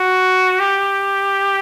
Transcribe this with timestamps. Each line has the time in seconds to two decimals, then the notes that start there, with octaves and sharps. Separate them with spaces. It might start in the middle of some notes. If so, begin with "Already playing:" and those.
Already playing: F#4
0.60 G4